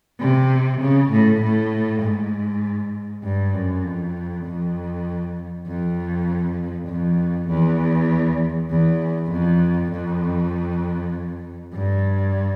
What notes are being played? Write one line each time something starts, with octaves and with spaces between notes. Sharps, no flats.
C3
C#3
A2
A2
G#2
G2
F#2
F2
F2
F2
F2
E2
E2
F2
F2
G2